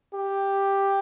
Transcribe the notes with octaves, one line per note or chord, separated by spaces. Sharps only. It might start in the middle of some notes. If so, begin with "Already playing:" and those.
G4